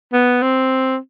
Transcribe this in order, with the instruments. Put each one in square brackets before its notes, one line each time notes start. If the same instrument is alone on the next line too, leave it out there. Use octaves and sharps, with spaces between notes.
[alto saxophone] B3
C4